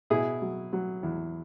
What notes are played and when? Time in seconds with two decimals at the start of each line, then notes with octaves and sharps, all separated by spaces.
0.10 B2 E4 G#4
0.42 F#3
0.73 F#3
1.03 E2